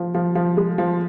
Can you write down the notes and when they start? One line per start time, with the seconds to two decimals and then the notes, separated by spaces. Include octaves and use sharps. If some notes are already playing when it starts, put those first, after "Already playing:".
Already playing: F3
0.15 F3
0.35 F3
0.57 G#3
0.78 F3